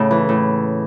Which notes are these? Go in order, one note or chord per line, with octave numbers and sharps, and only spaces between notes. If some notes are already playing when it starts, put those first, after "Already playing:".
Already playing: A2 C#3
E3
A2